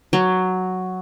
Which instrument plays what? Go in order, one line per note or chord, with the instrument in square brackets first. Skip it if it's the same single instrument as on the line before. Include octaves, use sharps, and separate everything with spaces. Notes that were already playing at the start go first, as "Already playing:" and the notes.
[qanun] F#3